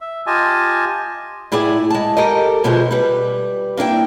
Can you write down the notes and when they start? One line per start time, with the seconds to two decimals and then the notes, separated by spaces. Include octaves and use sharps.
0.01 E5
0.27 F4 G4 D#5 G#5 A5
1.52 A2 E4 G#4 D5 G#5
1.90 G#3 A5
2.17 G4 A4 A#4 D#5
2.64 D2 B2 F3 G#3 G#4 C5
2.91 G3 B4
3.77 A#3 D4 E4 G5